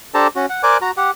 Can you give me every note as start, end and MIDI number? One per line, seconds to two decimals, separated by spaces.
0.14 0.27 62
0.14 0.27 67
0.14 0.27 69
0.14 0.27 72
0.14 0.27 81
0.14 0.27 82
0.36 0.46 61
0.36 0.46 66
0.49 0.62 78
0.63 0.77 70
0.63 0.77 72
0.63 0.77 74
0.63 0.77 80
0.63 0.77 86
0.63 0.77 90
0.81 0.91 66
0.81 0.91 82
0.97 1.11 67
0.97 1.11 78